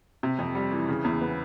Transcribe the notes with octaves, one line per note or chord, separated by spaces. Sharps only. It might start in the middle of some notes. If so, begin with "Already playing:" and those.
C3
F2
G3
E3
C#3
E2
B3